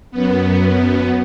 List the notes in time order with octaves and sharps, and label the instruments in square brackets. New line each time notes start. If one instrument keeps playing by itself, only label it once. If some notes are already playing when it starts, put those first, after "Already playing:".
[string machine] F#2 B3